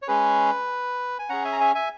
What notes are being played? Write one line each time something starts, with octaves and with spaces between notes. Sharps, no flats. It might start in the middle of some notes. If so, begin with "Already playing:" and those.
C#5
G#3 C#4 G#4 B4
G#5
C#4 G#4 F#5 A#5
E5 G#5
A#5
E5 G#5
E5 G#5